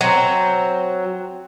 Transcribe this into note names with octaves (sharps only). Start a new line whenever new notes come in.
F#3 C4